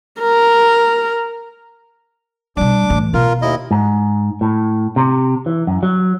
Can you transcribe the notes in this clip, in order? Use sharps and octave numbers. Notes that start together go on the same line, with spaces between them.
A#4
B2 G3 D4 D6
A2 E3
B2 F4 A#4
D#2 E4 D#5
G#2
A2
C3
E3
F#2
F#3